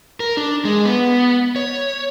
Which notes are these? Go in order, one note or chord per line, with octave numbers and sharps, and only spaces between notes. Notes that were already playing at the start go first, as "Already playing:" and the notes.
A#4
D4
G#3
B3
C#5